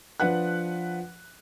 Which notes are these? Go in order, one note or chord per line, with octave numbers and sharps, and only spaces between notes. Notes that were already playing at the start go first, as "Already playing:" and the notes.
F3 D4 B4 F#5 F#6